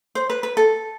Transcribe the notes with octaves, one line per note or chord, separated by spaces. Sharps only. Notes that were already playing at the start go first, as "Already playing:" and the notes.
C5
B4
B4
A4